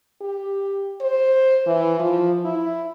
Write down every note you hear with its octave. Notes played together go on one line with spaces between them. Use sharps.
G4
C5
E3
F3
E4